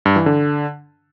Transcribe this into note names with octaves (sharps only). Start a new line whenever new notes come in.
G2
E3
D3